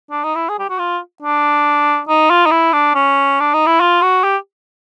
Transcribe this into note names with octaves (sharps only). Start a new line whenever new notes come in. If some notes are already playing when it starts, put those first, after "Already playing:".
D4
D#4
E4
G#4
G4
F#4
F4
D4
D#4
F4
D#4
E4
D4
C#4
D4
D#4
E4
F4
F#4
G4